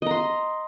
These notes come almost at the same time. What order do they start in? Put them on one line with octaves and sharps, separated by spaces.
D#5 A#5 C6